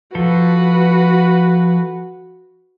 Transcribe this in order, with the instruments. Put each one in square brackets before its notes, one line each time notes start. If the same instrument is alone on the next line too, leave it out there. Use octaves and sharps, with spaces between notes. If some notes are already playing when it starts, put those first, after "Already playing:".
[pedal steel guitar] F3 A4 [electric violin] F#4 B4